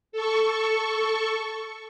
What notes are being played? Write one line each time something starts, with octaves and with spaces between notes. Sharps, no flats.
A4 C#6